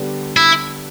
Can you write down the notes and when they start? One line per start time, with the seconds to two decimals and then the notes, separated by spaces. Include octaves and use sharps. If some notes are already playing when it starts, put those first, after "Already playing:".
Already playing: D3 G3 B3 G4
0.37 E4